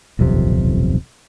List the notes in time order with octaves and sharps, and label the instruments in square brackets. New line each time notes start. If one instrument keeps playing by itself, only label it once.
[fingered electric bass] D#1 B1 F2 C3